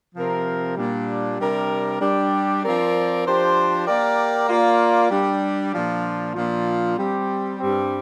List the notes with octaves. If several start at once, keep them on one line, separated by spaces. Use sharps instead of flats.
C3 F3 C4 A#4
A#2 G3 D4
C3 G3 D4 A#4
G3 D4 G4
F3 C4 A#4 D5
F3 D4 G4 C5
A#3 G4 A#4 D5
A#3 F4 D5
G3 D4 G4
A#2 F3 D4 F4
A#2 F3 D4 F4
G3 C4 G4
G2 G3 C4